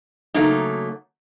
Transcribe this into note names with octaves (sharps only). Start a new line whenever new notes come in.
C#3 F#3 A3 A#3 D#4